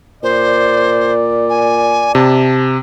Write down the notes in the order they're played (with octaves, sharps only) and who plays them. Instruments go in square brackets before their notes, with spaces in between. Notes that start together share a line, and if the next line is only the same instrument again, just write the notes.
[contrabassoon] A#2 [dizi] C5 [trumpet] D5
[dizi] G#5
[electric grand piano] C3 [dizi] A5